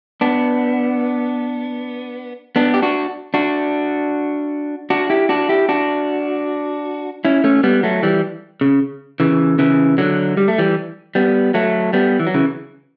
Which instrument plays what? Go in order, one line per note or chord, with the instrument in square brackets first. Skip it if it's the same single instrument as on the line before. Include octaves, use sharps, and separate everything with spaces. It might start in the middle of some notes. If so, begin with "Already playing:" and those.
[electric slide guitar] B3 D4
B3 D4
G4
D4 F#4
D4 F#4
D4 F#4
E4 G4
D4 F#4
E4 G4
D4 F#4
C#4 E4
A3 C#4
G3 B3
F#3 A3
E3 G3
C#3
C#3 E3
C#3 E3
D3 F#3
G3
A3
E3 G3
G3 B3
F#3 A3
G3 B3
E3
F#3
C#3 E3